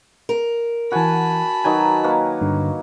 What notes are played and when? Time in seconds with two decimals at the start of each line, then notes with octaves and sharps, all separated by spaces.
0.29 A#4
0.92 E3 F#4 F#5 G#5 A5 B5
1.64 D#3 F#3 B4 D#5 G#5
2.04 A#3 B4 C#5
2.41 G2 D3